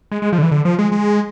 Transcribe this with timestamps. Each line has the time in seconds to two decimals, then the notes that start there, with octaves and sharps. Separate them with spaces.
0.12 G#3
0.22 G#3
0.32 F3
0.38 D3
0.43 E3
0.51 D3
0.65 F3
0.79 G#3
0.92 G#3